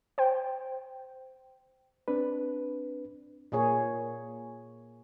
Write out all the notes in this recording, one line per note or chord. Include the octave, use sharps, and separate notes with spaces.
C5 G5
C4 D4 B4
A#2 A#3 G#4 C#5